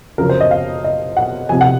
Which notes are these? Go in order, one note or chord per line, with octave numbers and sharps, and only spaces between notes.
F#1 F#2 F3 A#4
C5
D#5
F5
D#5
F#5
C2 C3 F3 G#5
F#5